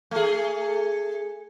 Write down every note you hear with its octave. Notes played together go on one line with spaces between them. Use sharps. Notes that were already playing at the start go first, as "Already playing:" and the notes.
A3 G#4